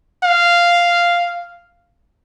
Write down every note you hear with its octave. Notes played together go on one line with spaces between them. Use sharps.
F5